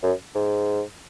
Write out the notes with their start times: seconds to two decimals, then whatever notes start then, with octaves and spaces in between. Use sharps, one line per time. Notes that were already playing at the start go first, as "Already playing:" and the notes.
0.03 F#2
0.35 G#2